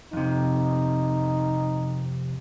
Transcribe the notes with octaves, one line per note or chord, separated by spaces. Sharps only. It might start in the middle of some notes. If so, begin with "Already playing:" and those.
F2 C3 D#4